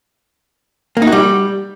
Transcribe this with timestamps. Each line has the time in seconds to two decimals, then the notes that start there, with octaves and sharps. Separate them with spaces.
0.97 A#3
1.02 D#4
1.07 F#4
1.12 G3